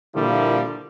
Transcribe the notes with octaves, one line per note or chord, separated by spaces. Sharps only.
A#2 D3 F3 G3 A#3 E4